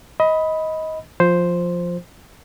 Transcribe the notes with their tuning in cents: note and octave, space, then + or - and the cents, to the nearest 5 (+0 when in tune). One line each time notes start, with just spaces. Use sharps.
D#5 +20 B5 +0
F3 +10 C5 +0